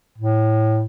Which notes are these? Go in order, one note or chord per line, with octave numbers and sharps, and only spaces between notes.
A2